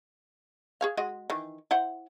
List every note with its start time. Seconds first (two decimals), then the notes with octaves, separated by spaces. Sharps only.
0.81 G#4 C#5 F5
0.97 G#3 F#4 D#5
1.30 D#3 E3
1.71 E4 C5 F#5